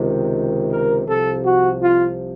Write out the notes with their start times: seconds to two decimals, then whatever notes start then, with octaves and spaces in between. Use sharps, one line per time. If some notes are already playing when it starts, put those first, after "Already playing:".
Already playing: C#2 C3 D#3
0.70 A#4
1.07 C2 C3 F3 A4
1.44 F#4
1.81 F4